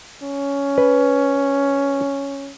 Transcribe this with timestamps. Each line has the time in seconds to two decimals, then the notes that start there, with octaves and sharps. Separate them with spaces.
0.22 C#4
0.78 B4